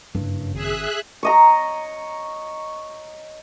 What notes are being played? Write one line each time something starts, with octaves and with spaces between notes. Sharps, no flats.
F#1 G2
G#1 G#4 E5 F#6
C#5 D#5 A#5